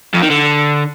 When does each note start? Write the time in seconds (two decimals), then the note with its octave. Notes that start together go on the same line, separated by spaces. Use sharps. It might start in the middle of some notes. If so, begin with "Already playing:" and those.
0.14 F2
0.22 D#3
0.30 D3